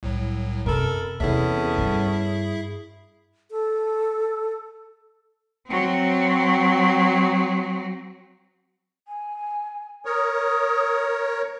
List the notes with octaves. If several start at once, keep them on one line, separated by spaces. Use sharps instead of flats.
C2 A2 F#3
F#2 C3 A4 A#4 B5
E2 C3 B3 C#4 E4 G#4 A4 E5
G2
A4
F#3 C4
G#5
A#4 C#5 D#6